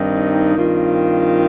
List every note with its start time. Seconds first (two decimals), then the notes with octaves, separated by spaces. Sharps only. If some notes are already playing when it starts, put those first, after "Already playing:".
Already playing: G2 D#3 C4 D#4
0.56 G2 D#3 C4 F4